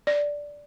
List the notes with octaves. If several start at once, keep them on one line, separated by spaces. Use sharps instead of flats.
D5